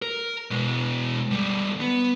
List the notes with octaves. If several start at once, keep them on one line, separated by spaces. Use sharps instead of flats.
A#4
B2 G#3
D2 G3
B3